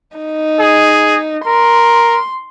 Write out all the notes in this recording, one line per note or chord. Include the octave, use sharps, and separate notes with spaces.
D#4
G#4
A#4 C6